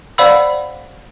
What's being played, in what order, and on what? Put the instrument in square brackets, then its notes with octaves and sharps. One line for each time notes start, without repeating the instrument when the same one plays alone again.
[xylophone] C5 D5 F5 F#5 B5 E6